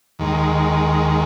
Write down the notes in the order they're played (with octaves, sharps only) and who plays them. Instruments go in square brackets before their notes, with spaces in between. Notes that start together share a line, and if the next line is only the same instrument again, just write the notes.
[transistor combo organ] D#2 D#3 G#3